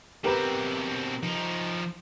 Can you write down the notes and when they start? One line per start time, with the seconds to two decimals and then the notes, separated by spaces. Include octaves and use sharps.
0.24 B2 C4 G4 A#4 B4
1.23 F3 D#4